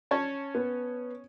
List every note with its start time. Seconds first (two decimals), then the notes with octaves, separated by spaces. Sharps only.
0.11 C#4 C#5 A5
0.55 B3